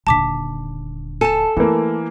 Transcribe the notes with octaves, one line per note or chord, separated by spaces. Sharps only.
D#1 D3 A5 D6 B6
A4 G#5 A5
E3 A3 A#3